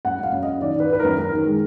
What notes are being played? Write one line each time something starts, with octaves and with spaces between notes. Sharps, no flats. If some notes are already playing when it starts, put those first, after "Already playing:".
F#2 F#5
F#2 F5
F#2
F#2 D#5
D#3 D5
D#3 B4
D#3 B4
F#2 A#4
F#2 A#4
D#3
G#3